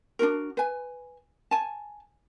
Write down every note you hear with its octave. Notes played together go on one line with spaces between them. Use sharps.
D4 D#4 F#4 A#4
B4 G#5
G#5 A5